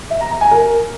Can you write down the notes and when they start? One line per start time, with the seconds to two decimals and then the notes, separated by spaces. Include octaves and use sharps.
0.11 E5
0.21 A#5
0.31 A#5
0.41 G#5
0.51 A#4